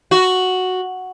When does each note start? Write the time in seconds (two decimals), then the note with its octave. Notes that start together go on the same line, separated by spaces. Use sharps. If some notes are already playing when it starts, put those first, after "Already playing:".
0.11 F#4